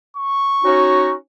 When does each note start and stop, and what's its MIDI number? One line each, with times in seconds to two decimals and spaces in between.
0.17 1.14 85
0.64 1.12 61
0.64 1.12 63
0.64 1.12 66